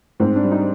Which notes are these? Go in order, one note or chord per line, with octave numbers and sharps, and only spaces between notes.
G#2 C4
D4
G3
D#4